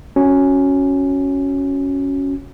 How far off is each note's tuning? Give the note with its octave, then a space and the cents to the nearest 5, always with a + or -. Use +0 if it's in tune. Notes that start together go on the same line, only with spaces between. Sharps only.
C#4 +0 F#4 -5